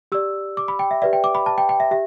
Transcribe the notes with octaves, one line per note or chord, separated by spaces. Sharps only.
G4 D5 E6
D6
B5
G5
E5
G4 B4 D5 E5
G5
D6
B5
A5
G5
G5
E5
G4 E5